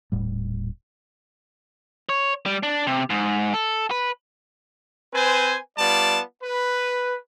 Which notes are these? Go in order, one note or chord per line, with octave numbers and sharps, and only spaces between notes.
D#1 A2 G3
C#5
G3
D4
C3
G#2
A4
B4
C4 B4 C5 G#5
G3 B3 F4 D5 A5
B4